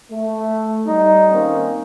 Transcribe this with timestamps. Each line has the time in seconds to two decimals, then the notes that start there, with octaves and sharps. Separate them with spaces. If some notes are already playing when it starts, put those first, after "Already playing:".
0.10 A3
0.86 G3 D#4
1.32 D#3 A#3 C4 C#4